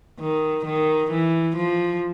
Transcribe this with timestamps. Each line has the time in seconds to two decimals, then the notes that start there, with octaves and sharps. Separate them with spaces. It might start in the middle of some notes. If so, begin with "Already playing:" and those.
0.20 D#3
0.65 D#3
1.11 E3
1.56 F3